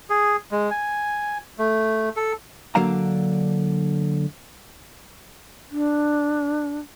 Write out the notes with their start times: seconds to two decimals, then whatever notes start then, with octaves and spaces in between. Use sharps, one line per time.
0.10 G#4
0.51 G#3
0.71 G#5
1.58 A3
2.16 A4
2.75 D3 F#3 A#3 D4 F5 A#5
5.71 D4